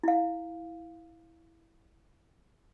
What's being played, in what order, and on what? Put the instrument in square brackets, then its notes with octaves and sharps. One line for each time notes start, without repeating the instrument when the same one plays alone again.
[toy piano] E4 F5